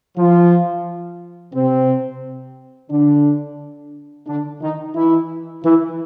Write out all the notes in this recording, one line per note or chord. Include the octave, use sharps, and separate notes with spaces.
F3 F4
C3 C4
D3 D4
D3 D4
D#3 D#4
E3 E4
E3 E4